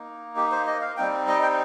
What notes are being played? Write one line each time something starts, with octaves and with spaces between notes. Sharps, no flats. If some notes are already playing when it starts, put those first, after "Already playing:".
Already playing: A#3 D#4
G4
C5
D#5
F5
G3 C4 D#4 G5
D#5
G5